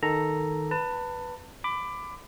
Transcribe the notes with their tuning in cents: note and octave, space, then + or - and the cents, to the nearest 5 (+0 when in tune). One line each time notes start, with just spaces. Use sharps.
D#3 +0 A4 +0 A#5 +0
B4 +0 A5 +35
B5 +25 D6 +10